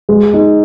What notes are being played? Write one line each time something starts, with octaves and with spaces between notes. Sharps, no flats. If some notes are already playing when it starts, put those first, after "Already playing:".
G#3
D#4